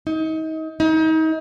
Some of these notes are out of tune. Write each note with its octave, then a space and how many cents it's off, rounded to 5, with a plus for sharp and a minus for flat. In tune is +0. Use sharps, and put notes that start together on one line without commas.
D#4 +30
D#4 +35